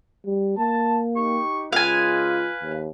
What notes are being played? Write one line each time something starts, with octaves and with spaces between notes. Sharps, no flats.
G3
A#3 A5
D#4 G4 C#6
C#3 G#3 F4 B4 F5 G#5
D#2